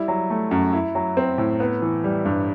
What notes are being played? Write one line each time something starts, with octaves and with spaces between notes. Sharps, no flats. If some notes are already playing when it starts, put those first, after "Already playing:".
Already playing: G3 E4
F#3
A3
F#2
E4
F#3
C4
A2
B3
E3
G3
G2